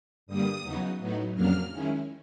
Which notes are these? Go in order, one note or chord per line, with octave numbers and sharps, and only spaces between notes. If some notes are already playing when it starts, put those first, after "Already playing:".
G2 D3 G3 A#3 D#6
E2 C#3 F#3 B3 D#4
A2 F#3 B3 D#4
F2 C#3 F#3 A#3 D4 F6
D#3 G#3 C#4 E4